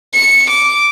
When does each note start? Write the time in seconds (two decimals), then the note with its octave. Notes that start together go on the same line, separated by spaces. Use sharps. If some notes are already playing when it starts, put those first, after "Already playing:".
0.14 C#7
0.50 D6